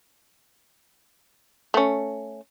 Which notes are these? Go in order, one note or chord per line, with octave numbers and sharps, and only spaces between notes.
A3 C#4